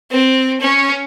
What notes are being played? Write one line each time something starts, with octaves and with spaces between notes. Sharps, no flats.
C4
C#4